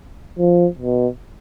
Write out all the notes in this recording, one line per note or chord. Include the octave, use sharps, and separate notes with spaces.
F3
B2